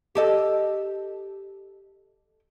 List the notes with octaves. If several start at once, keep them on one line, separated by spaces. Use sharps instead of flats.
G4 A4 D#5